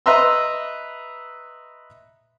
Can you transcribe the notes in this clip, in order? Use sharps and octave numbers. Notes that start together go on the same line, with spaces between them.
B4 D#5 E5 A#5 C6 E6